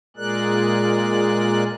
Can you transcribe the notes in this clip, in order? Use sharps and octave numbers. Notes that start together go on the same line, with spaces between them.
A#2 G#3 G#4 A#4 D5 F#6